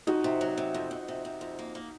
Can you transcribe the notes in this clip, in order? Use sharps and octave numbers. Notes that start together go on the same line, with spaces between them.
F2 D#4 F#4
C3
F#3
C3
F2
F2
C3
C3
F2
A#3
A#3